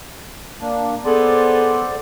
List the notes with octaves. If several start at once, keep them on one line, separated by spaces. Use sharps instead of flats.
A#3 D4
B3 G#4 A4 C5 D5